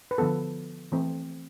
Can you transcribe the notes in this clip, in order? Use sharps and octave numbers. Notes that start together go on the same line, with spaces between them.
B4
D3 F3 B3 A4
E3 A3 C4